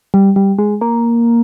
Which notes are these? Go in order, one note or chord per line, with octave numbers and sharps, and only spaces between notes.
G3
G3
G#3
A#3